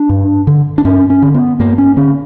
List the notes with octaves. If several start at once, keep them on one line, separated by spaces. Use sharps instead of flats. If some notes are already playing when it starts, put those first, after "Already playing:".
Already playing: D4
G2
D3
D4
G2 C#4
C#4
D3
B3
G2 A#3
C#4
D3 C#4